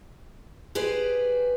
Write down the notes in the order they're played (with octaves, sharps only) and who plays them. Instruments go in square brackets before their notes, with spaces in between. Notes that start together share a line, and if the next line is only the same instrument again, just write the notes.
[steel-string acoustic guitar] G4 G#4 B4 C5 D5